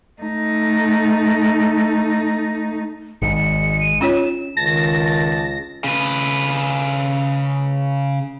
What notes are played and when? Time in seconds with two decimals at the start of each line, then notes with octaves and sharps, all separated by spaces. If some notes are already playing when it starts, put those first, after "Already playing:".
0.22 A3 D#4
3.22 G#1 G#3 D#4 C#7
3.81 D#7
4.01 C#4 F4 C#5 E7
4.57 C#2 D#3 A5 A#6
5.84 C#3 B4